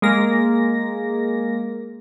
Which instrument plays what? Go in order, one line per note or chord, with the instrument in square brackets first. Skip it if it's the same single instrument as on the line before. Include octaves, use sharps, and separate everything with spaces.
[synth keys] G#3 A#3 A#6